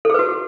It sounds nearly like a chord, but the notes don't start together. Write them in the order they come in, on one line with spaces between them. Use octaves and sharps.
A4 G#4 B4 F#4